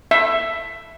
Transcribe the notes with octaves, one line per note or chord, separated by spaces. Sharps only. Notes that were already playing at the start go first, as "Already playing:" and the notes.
E5